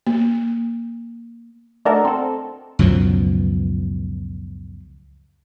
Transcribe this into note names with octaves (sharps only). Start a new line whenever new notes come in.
A#3
A3 D4 D#4 F#4 A4 A#4
C4 A4
C#2 F#2 B2 F3